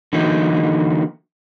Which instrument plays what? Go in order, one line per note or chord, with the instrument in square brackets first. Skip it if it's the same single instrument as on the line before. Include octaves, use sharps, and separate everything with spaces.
[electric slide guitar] D3 E3 F#3 A#3 D#4